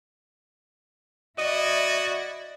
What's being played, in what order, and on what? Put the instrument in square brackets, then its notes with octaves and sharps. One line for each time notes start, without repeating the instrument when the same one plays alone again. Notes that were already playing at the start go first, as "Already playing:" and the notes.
[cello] E4 D5 [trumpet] F#4 [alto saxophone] D#5